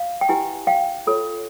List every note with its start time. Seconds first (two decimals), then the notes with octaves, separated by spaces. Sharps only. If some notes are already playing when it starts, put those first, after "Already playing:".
Already playing: F5
0.21 G5
0.29 E4 G4 B4 F#5 G#5
0.67 F5 G5
1.07 F4 A4 C#5